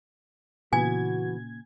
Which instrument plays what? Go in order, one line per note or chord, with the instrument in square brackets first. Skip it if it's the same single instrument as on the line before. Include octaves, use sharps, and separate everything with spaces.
[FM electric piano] A#2 C#3 G#6 [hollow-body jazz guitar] E3 B3 [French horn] F#4 [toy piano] G#5